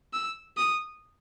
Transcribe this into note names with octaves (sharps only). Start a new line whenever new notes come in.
E6
D#6